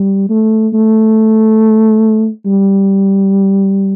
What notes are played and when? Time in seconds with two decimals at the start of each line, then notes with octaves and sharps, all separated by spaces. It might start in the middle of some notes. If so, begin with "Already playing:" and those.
Already playing: G3
0.29 A3
0.73 A3
2.46 G3